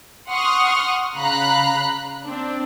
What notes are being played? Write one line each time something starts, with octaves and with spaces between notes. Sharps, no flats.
F#5 C6 C#6 D#6 F6
C#3 F5 A#5 B5 F#6
C4 D4